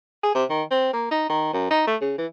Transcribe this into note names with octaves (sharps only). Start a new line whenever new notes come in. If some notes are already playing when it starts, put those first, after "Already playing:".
G#4
C3
D#3
C4
A#3
D#4
D#3
F#2
D#4
A3
C#3
E3